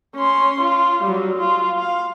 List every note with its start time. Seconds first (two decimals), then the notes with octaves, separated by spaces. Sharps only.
0.15 C#4 C6
0.60 F4
1.03 F#3 G3
1.37 F4
1.79 F5